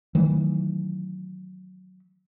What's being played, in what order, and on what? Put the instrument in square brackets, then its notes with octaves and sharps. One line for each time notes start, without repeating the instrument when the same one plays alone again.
[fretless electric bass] D#3 E3 F#3 A3